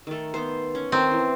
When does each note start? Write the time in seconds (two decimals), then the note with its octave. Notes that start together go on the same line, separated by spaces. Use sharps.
0.07 D#3 A3
0.34 B3 C5
0.75 C#4
0.92 D#3 F3 C4 D#4
1.11 E3